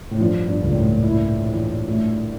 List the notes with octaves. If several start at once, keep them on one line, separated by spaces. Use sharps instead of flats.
A2
G2 F3
G2
C#2
A#2
A2
E4
E3
A3